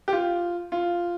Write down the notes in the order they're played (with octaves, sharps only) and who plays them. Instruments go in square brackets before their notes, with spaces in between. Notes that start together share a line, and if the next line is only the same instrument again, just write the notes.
[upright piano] G4
F4
F4